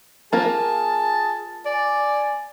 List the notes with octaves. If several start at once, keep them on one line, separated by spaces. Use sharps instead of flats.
A#3 F4 G#4 A#4 A5
D5 G#5